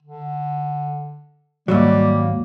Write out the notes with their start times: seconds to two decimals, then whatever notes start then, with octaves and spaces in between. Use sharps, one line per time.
0.02 D3
1.68 D#2 G#2 F#3 G3 A#3